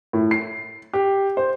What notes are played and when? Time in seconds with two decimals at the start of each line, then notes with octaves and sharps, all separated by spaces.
0.13 A2
0.31 C7
0.93 G4
1.37 C5